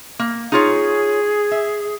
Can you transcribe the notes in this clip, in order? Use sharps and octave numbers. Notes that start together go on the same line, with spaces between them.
A#3
D#4 F4 G#4 C#5
E5